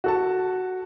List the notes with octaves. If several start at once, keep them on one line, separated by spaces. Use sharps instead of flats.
F#4 A4 A5